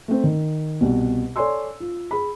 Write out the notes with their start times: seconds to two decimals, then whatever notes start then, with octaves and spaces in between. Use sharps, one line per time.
0.08 A3 C4
0.24 D#3
0.81 C2 B2
1.36 A4 C#5 D5 G#5 C6 E6
1.80 F4
2.11 G#4 B5